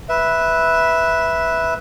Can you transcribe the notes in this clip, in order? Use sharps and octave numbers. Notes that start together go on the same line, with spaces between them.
B4 E5